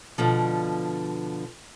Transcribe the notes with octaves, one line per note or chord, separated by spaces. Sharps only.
B2 D3 F3